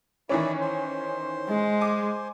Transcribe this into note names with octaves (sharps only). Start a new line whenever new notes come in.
D#3 E3 C#4 E4 D5
C5
G#3
G#5 D6